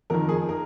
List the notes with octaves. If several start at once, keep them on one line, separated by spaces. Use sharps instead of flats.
F2 D#3 A#4
G#4
A#4